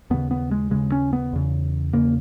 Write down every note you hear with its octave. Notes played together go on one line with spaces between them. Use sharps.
D#2 C#3 B3
B3
G#3
D#2 C#3 G#3
C#4
B3
E2 C#3
E2 C#3 A#3